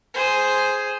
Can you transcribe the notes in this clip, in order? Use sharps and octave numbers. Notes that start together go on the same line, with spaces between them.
G#4 C5